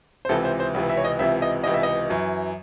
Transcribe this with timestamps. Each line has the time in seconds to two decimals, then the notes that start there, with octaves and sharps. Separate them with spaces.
0.25 C5
0.29 C#2 C3 E3 A4
0.45 C5
0.60 C5
0.74 C#2 C3 E3
0.90 E5
0.97 C#5
1.04 D#5
1.19 C#2 C3 E3 E5
1.42 D#5
1.64 C#2 C3 E3 D#5
1.74 E5
1.83 D#5
2.09 F#2 E3